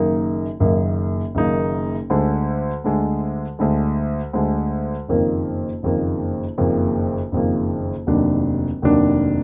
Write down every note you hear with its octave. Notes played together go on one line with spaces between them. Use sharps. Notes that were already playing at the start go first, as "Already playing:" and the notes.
Already playing: F#1 F#2 D#3 A#3 D#4
F#1 F#2 D#3 A#3 D#4
F#1 F#2 D#3 A#3 D#4
D2 D3 G#3
D2 D3 G#3
D2 D3 G#3
D2 D3 G#3
F#1 F2 D#3 A#3
F#1 F2 D#3 A#3
F#1 F2 D#3 A#3
F#1 F2 D#3 A#3
F1 D#2 D#3 F#3 D4
F1 D#2 D#3 F#3 D4